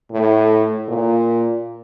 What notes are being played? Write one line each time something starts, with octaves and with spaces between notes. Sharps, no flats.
A2
A#2